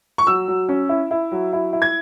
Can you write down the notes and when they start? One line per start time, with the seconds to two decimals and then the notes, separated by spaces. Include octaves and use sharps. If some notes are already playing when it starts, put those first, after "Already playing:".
0.18 C#6
0.27 F#3 E6
0.48 F#3
0.69 C#4
0.89 E4
1.11 E4
1.32 F#3
1.53 E4
1.73 E4
1.82 G#6